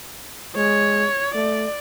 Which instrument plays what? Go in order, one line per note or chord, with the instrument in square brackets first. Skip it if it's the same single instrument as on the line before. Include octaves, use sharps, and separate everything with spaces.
[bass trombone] G#3 [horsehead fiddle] C#5
[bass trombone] A3 [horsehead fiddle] D5